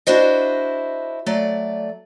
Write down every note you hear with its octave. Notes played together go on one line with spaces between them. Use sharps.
D4 E4 F#4 C5 D#5
F#3 A3 D5